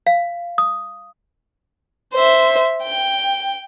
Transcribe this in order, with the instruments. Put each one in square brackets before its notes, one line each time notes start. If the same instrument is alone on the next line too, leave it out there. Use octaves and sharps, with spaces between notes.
[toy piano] F5
D#6
[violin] C5 E5
G5